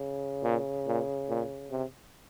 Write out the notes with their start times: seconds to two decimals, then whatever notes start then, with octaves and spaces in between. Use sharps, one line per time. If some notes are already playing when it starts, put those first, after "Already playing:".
Already playing: C#3
0.44 A#2
0.87 A#2
1.29 A#2
1.71 C3